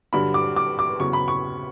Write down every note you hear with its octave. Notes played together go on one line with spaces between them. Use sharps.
G2 D3 F#3 B5
D6
D6
D6
E2 C#3 F#3 C#6
B5
C#6